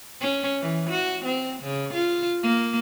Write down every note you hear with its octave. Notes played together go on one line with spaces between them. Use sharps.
C#4
E3
F#4
C4
C#3
F4
A#3